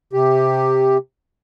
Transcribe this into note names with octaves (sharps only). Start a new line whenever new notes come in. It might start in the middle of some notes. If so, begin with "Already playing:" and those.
C3 G4